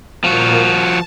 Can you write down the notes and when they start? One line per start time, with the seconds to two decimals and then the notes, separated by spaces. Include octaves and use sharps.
0.24 A#2 F3 A#3 F#4
0.67 A5